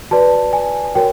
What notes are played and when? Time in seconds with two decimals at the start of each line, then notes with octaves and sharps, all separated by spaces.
0.11 F#4 B4 D5 A5
0.53 G#5
0.95 F#4 A#4 C#5 G5